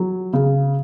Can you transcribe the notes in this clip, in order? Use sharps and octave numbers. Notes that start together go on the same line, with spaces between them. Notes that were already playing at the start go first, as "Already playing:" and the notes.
Already playing: F#3
C#3